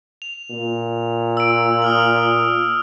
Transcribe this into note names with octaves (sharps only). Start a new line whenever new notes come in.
F7
A#2
E6 D7
D#6 F6 F#7